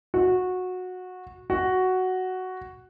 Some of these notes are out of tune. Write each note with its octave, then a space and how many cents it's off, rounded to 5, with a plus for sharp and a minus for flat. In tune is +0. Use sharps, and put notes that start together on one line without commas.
F#4 -15
F#4 +5